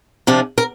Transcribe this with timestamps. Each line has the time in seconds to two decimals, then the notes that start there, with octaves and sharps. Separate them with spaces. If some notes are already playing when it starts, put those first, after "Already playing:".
0.27 C3 F3 D4
0.58 A#4